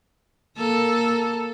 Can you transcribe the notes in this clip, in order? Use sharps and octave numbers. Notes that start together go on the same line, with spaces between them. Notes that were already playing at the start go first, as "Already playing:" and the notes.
A#3 A4